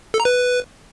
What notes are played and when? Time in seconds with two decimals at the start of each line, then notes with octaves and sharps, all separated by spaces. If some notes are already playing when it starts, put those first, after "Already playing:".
0.14 A4
0.20 A#5
0.25 B4